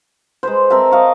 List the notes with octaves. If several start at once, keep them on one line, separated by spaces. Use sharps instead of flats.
G#3 B4 C5
C4 A#4 E5 A5
D#5 F5 C#6